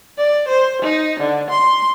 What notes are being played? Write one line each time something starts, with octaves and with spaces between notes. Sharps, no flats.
D5
C5
D#4
D3
C6